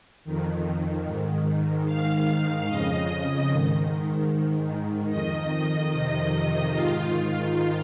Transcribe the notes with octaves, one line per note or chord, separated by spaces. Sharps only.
F2 D#3
G#2 D#3
G#2 D#3 F5
F2 C#3 D#5
G#2 D#3
G#2 D#3
F2 D#3 D#5
D#5
F2 C3 D#3
G#2 D#3 F4
F4